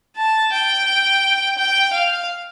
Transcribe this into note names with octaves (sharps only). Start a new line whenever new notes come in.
A5
G5
G5
F5